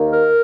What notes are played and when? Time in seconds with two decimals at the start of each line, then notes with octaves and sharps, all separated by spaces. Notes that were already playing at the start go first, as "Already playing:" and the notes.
Already playing: D#2 D#3 A#3
0.12 A#4